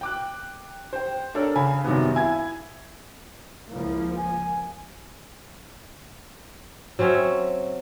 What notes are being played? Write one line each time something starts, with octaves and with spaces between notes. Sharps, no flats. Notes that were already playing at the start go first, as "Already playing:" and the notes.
G5 D6 F#6
C5 G5
D4 A4 A#4 C#5
C#3 G#5 B5
F#2 C3 D#3 G3 B3
E4 G#5 G#6
C#2 F3 A#3 E4
G#5
F#3 C4 C#4 E5